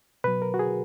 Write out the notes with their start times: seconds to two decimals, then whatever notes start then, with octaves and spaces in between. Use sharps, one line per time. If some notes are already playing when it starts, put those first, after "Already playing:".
0.24 B2 F#3 B4
0.42 A#4
0.54 F#4
0.59 G#4